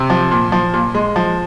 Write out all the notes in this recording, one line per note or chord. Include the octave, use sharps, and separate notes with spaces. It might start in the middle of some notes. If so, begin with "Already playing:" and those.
Already playing: C3
F3
A#2
F3
A#2
G#3
F3